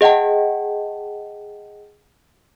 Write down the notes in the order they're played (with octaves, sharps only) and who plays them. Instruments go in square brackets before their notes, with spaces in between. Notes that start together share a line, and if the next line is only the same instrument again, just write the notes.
[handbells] G#4 D#5 F#5 G5 A5